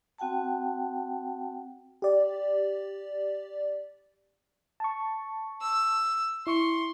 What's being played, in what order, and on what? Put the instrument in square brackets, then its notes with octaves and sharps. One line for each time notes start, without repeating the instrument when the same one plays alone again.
[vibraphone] C4 F#4 F#5 G5 A5
[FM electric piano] G4 D5
A5 C#6
[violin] E6
[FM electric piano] E4 C#6 C#7 [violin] C6